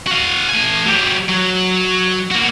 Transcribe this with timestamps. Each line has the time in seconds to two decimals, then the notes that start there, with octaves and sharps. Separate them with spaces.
0.07 F#4 F5
0.49 A3 G#5
0.86 F#3 G4
1.28 F#3
2.31 A#3 F#4